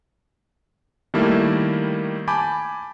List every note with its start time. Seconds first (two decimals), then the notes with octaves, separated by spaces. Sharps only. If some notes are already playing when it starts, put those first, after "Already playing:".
1.14 D#3 G3 A3 A#3 E4
2.28 G#5 A5 B5 D6 G6